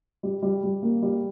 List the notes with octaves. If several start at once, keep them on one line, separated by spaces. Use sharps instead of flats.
G3
G3
G3
A#3
G3